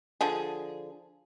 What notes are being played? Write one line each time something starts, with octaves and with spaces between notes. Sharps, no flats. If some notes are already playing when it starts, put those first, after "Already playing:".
D3 F3 G#4